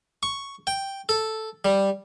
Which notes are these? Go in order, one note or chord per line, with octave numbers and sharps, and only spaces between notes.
C#6
G5
A4
G3